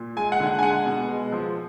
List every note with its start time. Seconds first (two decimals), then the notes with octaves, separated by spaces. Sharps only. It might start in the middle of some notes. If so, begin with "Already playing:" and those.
Already playing: A#2
0.16 G#3 G#5
0.32 F#5
0.40 D3
0.47 F#5
0.59 G#5
0.62 G#3 F#5
0.86 B2
1.09 G#3
1.32 F3